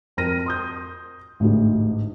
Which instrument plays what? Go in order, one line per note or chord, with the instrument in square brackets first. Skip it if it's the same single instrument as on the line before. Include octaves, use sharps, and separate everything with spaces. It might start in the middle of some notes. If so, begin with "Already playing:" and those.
[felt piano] F2 C4 A#4 F6 A#6 D#7
C6 D#6 G6
A1 D2 G#2